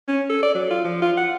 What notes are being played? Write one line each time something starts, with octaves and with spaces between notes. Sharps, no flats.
C#4
A4
D5
F#3
F4
F3
F4
F#5